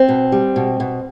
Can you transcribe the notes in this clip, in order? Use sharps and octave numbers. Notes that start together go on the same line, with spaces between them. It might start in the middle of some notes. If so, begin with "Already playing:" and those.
Already playing: C4
B2
G3
B2
B2